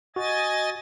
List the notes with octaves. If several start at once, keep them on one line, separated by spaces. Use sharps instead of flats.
F#4 D#5 G#5 A6